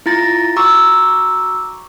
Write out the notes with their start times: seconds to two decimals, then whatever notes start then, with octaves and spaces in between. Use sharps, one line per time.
0.06 E4 F4 A#5 A6 A#6
0.56 F#4 A#5 C#6 D6 E6